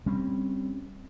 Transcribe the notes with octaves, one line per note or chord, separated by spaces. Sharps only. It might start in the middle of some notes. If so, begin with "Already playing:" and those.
G3 C4 C#4